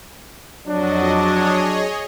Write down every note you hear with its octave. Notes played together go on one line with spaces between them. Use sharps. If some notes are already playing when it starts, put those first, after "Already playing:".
F2 F#3 D4 F#4 D#5
G#4 C#5 D#5